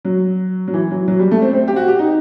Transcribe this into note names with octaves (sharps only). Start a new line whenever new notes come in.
F#3
F#3
E3
F#3
F#3
G3
A3
C4
C4
G4
F#4
G4
D#4